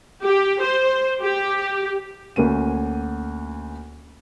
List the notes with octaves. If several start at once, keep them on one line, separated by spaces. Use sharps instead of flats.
G4
C5
G4
D2 A#3 C#4 D#7